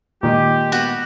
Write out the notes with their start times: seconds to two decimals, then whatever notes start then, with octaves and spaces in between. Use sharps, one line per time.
0.23 A#2 D#3 G#3 G4
0.72 B3 F#4